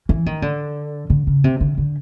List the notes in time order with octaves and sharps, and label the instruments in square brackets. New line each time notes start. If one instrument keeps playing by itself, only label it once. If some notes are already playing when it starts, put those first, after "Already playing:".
[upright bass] E3
D#3
D3
D3
C#3
C3
D3
D3